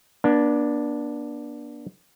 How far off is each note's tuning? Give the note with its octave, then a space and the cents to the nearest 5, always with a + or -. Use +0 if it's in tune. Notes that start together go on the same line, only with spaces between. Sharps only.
B3 -45 D4 +0